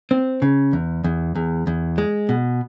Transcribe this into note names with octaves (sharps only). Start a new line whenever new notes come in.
C4
C#3
E2
E2
E2
E2
G#3
B2